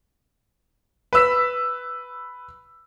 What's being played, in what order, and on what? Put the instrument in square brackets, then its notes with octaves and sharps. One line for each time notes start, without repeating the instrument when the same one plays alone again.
[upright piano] B4 E6 B6